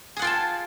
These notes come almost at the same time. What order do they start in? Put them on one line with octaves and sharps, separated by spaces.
G#4 F#5 F4 G5 A5